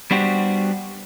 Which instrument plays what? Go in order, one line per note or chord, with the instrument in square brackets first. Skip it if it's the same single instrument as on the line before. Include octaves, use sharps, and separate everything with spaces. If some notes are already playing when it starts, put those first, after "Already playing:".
[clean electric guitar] G3 B3 D4 F#4 G4 C5